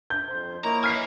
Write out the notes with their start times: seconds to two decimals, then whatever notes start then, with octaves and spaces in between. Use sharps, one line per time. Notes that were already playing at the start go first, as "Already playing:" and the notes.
0.10 G6
0.28 F2 C5
0.64 A#3 E4 C#5 D#5 A#5
0.84 B4 G#5 F6 C7